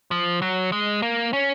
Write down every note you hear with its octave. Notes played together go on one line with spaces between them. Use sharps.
F3
F#3
G#3
A#3
C#4